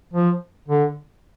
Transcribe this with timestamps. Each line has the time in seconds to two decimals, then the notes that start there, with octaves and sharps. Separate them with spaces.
0.14 F3
0.68 D3